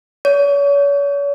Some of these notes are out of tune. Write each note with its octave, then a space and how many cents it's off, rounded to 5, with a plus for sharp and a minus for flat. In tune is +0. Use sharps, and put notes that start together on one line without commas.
C#5 +40